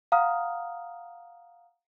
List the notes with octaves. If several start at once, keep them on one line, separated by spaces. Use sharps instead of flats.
F5 F#5 A#5 D#6 F6